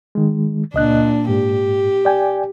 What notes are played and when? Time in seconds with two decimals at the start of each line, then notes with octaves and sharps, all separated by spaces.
0.15 D#3 G#3
0.74 C#2 A#2 D4 D#5 F#6
1.29 G#2 G4
2.05 D5 G5 G#5